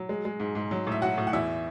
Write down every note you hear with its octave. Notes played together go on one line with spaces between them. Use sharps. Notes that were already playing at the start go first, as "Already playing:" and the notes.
Already playing: F#3
G#3
G#3
G#2
G#2
F#3
A2 E5
F#3 F#4 F#5
A2
F#5
E2 E4 E5